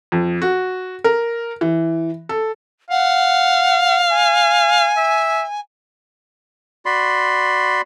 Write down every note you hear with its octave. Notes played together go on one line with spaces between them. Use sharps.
F2
F#4
A#4
E3
A4
F5 F#5
G#5
E5
F#4 D5 B5 C6